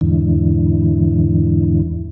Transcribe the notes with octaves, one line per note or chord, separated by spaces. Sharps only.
E2 G#2 D3 E3